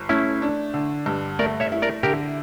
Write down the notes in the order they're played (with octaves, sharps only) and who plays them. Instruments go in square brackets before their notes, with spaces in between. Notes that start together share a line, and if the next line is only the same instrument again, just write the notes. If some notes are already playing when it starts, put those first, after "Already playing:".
Already playing: [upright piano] G1
[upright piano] A3 [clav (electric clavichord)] C#4 E4
[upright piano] D4
D3
G2
[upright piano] A3 [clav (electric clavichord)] A#4 D5
[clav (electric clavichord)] C#5 E5
[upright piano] E4
[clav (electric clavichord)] A#4 D5
[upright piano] D3 [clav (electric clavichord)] G4 A#4